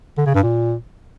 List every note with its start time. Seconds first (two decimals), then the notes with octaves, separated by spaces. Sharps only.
0.18 D3
0.26 C#3
0.35 G2
0.43 A#2